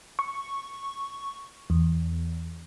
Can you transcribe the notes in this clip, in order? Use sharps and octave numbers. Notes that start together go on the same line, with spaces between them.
C#6
E2